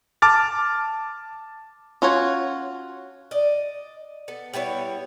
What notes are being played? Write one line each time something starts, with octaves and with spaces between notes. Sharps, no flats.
A5 D6 F6 A6
C#4 F4 F#4 C#5
D5 D#5
B3 A4
G3 B3 E4 C#5